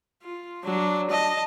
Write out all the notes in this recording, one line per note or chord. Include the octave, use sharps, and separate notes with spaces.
F4
F#3 D4
D#5 A5